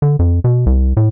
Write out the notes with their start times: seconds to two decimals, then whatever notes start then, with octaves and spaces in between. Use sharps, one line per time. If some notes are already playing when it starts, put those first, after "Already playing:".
0.02 D3
0.19 F2
0.44 B2
0.66 C2
0.97 A2